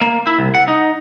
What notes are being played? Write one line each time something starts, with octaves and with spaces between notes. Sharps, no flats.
A#3
E4
C2
F#5
D#4